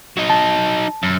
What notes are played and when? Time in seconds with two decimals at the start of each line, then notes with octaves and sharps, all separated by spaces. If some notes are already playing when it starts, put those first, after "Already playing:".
0.17 F#3 D#4
0.30 A5
1.03 F#2